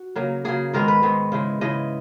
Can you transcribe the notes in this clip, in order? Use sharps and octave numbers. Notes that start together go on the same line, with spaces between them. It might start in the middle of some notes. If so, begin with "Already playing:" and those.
Already playing: F#4
C#3 F#3 A#3
C#3 F#3 A#3 G#4
G#2 D#3 G#3 B3 A#4
B4
G#2 D#3 G#3 B3
C#3 E3 G#3
C#3 E3 G#3 D#5